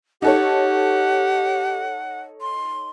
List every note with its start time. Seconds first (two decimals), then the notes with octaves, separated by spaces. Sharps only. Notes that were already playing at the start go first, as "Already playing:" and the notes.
0.22 D#4 G4 A4 C#5 F#5
2.41 C6